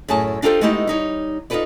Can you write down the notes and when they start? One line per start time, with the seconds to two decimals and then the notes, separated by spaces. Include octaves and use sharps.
0.08 F#2 A2 G#4 A5
0.42 D4 D#4 F4 G4 A4 C5
0.61 G#3 A3 B3 D#4 E4 G4
0.87 G3 D#4 C#5
1.50 D#4 F4 F#4 A4 B4 D5